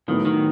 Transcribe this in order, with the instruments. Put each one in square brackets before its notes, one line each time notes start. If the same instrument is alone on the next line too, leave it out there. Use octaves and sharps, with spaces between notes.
[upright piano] A2 F#3 B3 [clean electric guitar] D#3
[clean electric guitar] D#3